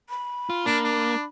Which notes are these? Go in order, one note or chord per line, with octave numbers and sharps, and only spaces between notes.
B5
F4
A#3 D4
D4